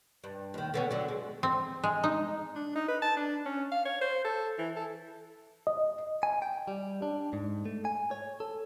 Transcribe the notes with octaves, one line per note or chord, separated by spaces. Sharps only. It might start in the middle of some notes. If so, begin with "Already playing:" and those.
G2
D#2 D#3
D3 B3 C#4
D3 F#3
G#3
C4
G#3
D#4
D4
D#4
B4
A5
D4
C#4
F5
C#5
C5
A4
E3
A4
D#5
G#5
G5
G3
D4
G#2
A3
G#5
C#5
A4